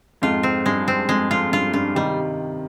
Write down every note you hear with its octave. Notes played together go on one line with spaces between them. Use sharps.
F2 G#2 F4
C4
G2 G#3
C4
F2 G#3
F2 F4
G2 F4
G2 F4
C3 D#3 G3